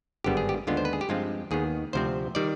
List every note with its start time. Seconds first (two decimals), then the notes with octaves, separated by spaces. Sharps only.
0.24 G#1 G2 D3 G3 B3 G4
0.37 G#4
0.49 G4
0.67 D#2 D3 G#3 B3 D4 F4
0.77 C5
0.85 B4
0.93 G#4
1.01 G4
1.09 G2 F3 G#3 C4 F4
1.51 D#2 D#3 B3 G#4
1.93 D2 C3 F3 C4 C5
2.35 D#3 G3 D5